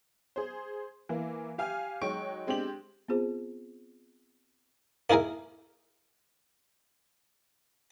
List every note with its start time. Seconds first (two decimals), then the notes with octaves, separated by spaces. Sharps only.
0.36 G#4 C5
1.09 E3 A#3
1.58 G4 F5 G#5 F6
2.02 F#3 G#3 D#4 G5 C#6 D7
2.47 G#3 C4 D4 G4 F#7
3.08 B3 C4 F4 G#4 C5
5.10 A#3 D#4 E4 G#4 A#4